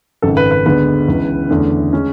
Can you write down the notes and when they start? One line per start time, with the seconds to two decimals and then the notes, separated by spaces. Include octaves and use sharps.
0.22 G#1 F#2 C#3 A4
0.37 B4
0.51 B4
0.66 D2 D3 G#3 B3 B4
1.08 C#2 C#3 E3
1.50 E2 D3 A3 C#4
1.93 G#3 C#4